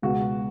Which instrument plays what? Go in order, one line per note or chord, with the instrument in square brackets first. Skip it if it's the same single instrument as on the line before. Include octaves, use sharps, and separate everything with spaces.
[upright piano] C#2 B2 B3 F#4